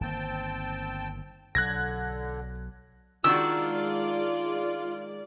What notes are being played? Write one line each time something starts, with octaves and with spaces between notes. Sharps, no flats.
G1 D#3 A#3 C4 G5 A5
B1 D3 F#3 F#6 G#6 A#6
D#3 G#3 D4 F4 F#4 D5 E6